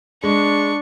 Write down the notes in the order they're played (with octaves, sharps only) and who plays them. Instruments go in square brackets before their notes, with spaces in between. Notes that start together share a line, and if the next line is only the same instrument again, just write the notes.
[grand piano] G#3 [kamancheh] D4 [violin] C#6